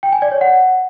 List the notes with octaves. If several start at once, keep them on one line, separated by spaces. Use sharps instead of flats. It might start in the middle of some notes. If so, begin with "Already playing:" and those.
G5
G#5
D5
C#5
F#5